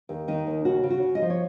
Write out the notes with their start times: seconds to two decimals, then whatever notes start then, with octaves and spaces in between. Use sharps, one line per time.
0.09 D#2
0.28 D#3 D#4
0.47 D#2
0.65 C#3 F#4
0.83 C#3
0.90 F#4
1.03 C#3
1.15 D#5
1.22 F3
1.30 C#5